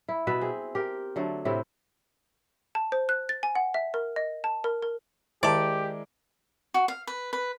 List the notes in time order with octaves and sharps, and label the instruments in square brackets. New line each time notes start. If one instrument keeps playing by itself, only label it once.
[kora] E4
B2 B4 E5
C4 G#4
G4 A#4
D3 F#3 A3
A2 C3 C4 E4
[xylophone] A5
C5
F#6
A6
G#5
F#5
E5
A#4
D#5
A5
A#4
A#4
[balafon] D#3 A5 [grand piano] G#3 E4 A#4 [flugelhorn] G4 [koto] D5
[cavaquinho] F#4
F5
B4
B4